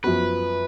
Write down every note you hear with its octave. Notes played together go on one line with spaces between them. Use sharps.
F#2 F3 B3 F#4 B4